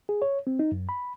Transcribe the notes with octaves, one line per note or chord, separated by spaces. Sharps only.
G#4
C#5
C4
D#4
F#2
B5